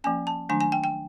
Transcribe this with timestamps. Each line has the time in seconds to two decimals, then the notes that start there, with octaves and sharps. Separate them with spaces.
0.04 F3 A#3 C#4 G#5
0.27 A5
0.49 D#3 F#3 A3 D4 G#5
0.61 G#5
0.72 G5
0.84 G5